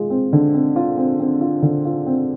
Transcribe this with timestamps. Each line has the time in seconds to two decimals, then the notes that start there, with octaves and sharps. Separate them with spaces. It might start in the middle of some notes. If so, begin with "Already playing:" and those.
Already playing: G#3 F4
0.10 C4
0.33 D3
0.54 C4
0.76 F4
0.97 C4
1.19 C4
1.41 F4
1.62 D3
1.85 F4
2.06 C4